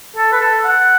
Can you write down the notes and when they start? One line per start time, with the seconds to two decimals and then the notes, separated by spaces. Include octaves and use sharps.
0.17 A4
0.32 B4
0.41 A4
0.65 F#5